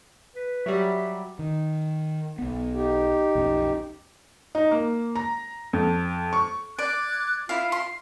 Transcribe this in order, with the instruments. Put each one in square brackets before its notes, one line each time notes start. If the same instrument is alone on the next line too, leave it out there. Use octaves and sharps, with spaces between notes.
[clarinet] B4
[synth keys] F#3 G3 [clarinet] E5
[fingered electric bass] D#3
B1 B3
[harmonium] D#4 G4
[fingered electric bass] B1 F2 C#4
[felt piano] D#4
A#3
A#5
F2
C#6
[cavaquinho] D5 [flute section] D6 F#6 G#6
[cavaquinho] E4 F5 [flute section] F4 E5
[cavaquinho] C6